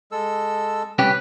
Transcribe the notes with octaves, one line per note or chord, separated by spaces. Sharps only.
G#3 A4 E6
C2 C#4 G4 B4